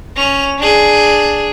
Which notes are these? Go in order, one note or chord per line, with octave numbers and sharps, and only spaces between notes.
C#4 F7
D4 G#4